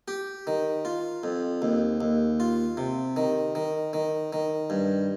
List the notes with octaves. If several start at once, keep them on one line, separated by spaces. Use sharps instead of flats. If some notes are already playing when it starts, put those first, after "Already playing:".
G4
D#3
F4
F2
D#2
D#2
F4
C3
D#3
D#3
D#3
D#3
G2